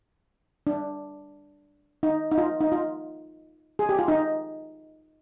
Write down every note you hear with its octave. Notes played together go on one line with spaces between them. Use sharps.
D4
D#4
D#4
F4
D#4
F4
G#4
G4
F4
D#4